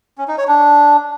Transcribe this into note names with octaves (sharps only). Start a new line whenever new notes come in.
C#4
D#4
C#5
D4